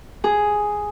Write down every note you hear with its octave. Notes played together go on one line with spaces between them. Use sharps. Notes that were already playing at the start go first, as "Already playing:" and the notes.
G#4